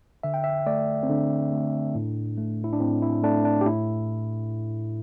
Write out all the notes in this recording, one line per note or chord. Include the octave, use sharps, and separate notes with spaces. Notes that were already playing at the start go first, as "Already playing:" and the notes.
D3 E5
G5
E5
A3 D5
C4
D3 D4
A3
A2
A3
E4
D4
A2 C4
E4
A3 D4
D4
G4
A2 E4